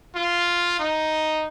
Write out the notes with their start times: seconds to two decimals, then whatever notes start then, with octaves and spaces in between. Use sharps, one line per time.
0.15 F4
0.79 D#4